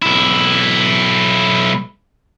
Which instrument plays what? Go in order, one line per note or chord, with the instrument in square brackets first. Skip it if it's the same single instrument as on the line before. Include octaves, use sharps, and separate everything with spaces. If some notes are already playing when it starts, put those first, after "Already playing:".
[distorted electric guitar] B1 E4